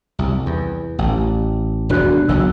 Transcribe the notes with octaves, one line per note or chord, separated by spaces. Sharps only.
C2
E2
A1
E1 D#2 D4 F#4 F#6
F#1 B1 F#3 E6